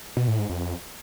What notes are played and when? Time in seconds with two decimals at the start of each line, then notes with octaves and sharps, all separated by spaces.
0.17 B2
0.28 A2
0.39 G#2
0.50 F2